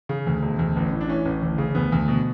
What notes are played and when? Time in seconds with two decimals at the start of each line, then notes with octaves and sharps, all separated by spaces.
0.09 C#3
0.27 D2
0.43 E1
0.59 D2
0.76 A1
0.92 A2
1.01 D4
1.08 E3 C#4
1.25 A1
1.42 D2
1.58 C#3
1.75 D2 B3
1.92 D2
2.08 B2